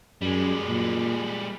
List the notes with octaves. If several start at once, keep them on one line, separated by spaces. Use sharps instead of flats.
F#2 G3 G#3
A#2